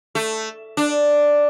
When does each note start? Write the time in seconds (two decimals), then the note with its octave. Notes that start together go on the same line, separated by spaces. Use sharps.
0.15 A3
0.77 D4